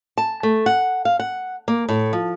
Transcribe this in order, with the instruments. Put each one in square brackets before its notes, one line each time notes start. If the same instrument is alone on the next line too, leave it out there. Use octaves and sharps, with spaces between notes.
[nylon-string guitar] A5
A3
F#5
F5
F#5
A#3
A2
F3